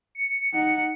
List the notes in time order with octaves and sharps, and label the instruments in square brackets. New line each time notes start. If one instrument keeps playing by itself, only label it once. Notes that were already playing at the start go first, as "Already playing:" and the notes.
[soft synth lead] C#7
[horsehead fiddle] D#4 F#5